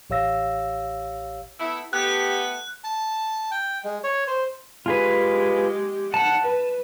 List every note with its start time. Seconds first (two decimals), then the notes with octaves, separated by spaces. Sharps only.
0.10 A1 G4 C#5 F5 E6 A#6
1.59 A3 B3 E4
1.93 A3 B3 G4 F#6
2.84 A5
3.51 G5
3.84 G#3
4.04 C#5
4.27 C5
4.86 G#3 F4 G4 G#4 B4
6.14 F#5 A5
6.45 B4